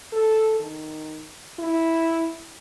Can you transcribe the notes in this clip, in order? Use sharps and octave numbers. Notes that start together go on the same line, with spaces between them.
A4
D#3
E4